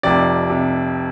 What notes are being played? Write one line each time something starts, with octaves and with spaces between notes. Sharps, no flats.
F1 F2 C3 D5
C3